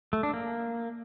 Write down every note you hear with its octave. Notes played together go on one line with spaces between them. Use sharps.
A3
D4
A#3